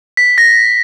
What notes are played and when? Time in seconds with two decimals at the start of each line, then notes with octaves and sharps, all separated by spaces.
0.17 B6
0.38 A#6